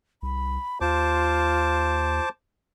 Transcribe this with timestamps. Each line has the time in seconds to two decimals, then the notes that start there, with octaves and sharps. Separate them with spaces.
0.23 C2 B5
0.81 D#2 F4 C5 A5 D6